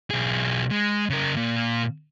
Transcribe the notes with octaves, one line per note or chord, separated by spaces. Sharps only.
B1 G#4
G#3
C#3 A#4
A#2